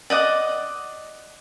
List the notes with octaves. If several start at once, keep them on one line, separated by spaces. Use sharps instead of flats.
D5 D#5 F#5 D6